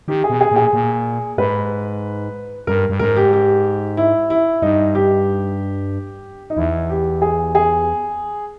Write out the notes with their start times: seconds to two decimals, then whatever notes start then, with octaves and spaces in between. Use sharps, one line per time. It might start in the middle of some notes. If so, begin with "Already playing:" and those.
0.08 D#3 G4
0.24 G#4
0.30 B2
0.41 G#4
0.51 A#2 G#4
0.73 A#2
1.38 G#2 B4
2.67 G2 A#4
2.89 G2
3.00 G#2 A#4
3.16 G4
3.33 G4
3.97 E4
4.30 E4
4.62 G2 D#4
4.95 G4
6.50 D#4
6.57 E2 E4
6.90 G4
7.22 G#4
7.55 G#4